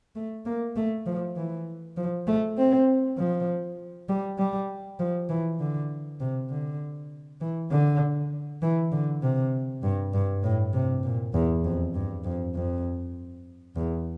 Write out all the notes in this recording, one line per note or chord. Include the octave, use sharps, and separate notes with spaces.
A3
A#3
A3
F3
E3
F3
A3
C4
F3
G3
G3
F3
E3
D3
C3
D3
E3
D3
E3
D3
C3
G2
G2
A2
C3
A#2
E2
F2
G2
F2
F2
E2